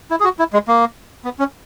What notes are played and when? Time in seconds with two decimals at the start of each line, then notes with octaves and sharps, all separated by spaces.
0.11 E4
0.20 G#4
0.24 F#4
0.39 E4
0.53 G#3
0.68 A#3
1.25 B3
1.39 C#4